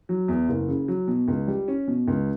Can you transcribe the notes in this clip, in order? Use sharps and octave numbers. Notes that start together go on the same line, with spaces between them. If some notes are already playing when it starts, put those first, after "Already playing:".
F#3
E2
F#1
C#3
F#3
B2
C#2
G3
C#4
B2
C#2